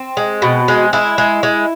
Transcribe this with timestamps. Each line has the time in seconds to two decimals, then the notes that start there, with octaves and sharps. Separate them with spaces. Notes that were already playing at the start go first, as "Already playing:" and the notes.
Already playing: C4
0.17 G#3
0.42 B2
0.68 G#3
0.93 G#3 E4
1.18 G#3
1.43 G#3